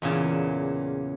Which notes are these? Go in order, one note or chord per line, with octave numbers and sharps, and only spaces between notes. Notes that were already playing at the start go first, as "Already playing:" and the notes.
E2 A#2 C#3 D5